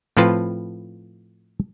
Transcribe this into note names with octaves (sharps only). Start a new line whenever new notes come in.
A2 F3 C4 F4 B4 A5